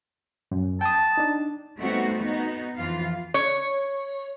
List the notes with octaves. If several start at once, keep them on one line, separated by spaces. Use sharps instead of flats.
F#2
G5 A5 D#6
D4 D#4
G3 A3 B3 C4 D#4 F#4
B3 D#4 F#4
F2 E3 F4 F5
C#5